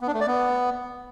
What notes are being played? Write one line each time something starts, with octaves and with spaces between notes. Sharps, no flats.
B3
D4
A3
D5
B3